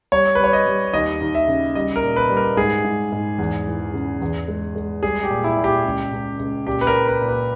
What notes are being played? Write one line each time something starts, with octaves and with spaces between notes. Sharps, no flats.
G3 C#5
B4
G3 C#5
D#5
G3
D#2 D#5
D#2
E5
C#3
G3 D#5
A#4
A#2
B4
G3
A#4
G#2 G#4
G#2
G#2
E2
E3
C#3
E2
G#3
G#3
G3 G#4
G4
A#2
E4
A#2
G4
C#2
C#2
C#2
A#2 G4
B4
A#4
A#2
B4
A#2
B4